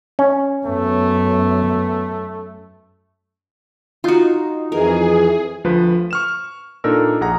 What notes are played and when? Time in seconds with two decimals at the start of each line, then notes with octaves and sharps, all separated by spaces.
0.19 C#4
0.66 F#2 A3 B3
4.04 D#4 F4 F#4
4.72 F2 E3 G#4 A#4
5.64 D2 F3 B4
6.11 C#6 F6 E7
6.84 A#2 D4 D#4 A4 A#4 E6
7.21 A#1 G#4 F#5 A#5